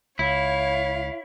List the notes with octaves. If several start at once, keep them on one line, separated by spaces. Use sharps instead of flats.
C#2 E4 C#5 F5